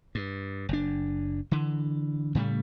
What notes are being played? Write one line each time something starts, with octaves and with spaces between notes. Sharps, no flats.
G2
F#1 D4
D3 E3
A2 C#3 G3 A3